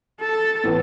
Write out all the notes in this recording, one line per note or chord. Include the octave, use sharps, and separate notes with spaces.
A4
A2 E3 B3 E4